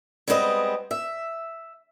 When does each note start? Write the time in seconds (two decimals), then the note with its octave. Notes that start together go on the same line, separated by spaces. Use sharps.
0.28 G3 G#3 B3 C4 B4 D#5
0.91 E5